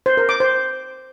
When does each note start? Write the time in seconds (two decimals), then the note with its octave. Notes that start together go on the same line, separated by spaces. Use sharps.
0.06 C5
0.17 A#4
0.29 D6
0.40 C5